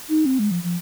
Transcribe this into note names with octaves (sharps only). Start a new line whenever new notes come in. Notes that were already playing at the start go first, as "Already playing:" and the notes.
D#4
C4
G#3
F3
F3